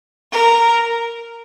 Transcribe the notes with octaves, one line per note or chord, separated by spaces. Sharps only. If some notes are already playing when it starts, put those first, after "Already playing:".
A#4